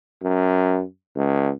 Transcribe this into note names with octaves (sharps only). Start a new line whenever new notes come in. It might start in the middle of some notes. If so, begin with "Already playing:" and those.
F#2
C#2